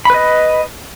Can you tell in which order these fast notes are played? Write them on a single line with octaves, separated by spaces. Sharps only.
B5 B4 D#5